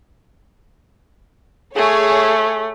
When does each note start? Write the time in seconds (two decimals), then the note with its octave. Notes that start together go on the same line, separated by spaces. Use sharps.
1.76 A3 G#4 C#5